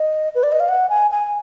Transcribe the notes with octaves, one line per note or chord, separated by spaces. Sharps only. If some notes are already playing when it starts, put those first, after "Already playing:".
Already playing: D#5
B4
D5
D#5
F5
F#5
G#5
G#5